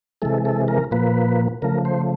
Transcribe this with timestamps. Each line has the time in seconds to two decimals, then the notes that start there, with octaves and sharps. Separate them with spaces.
0.22 C3 E3 G#3 A4
0.45 A4
0.68 A#4
0.91 A#2 F3 A#3 B4
1.62 C#3 F3 A3 A#4
1.85 C5